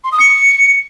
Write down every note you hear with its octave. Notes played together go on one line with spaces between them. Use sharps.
C6
D#6
C#7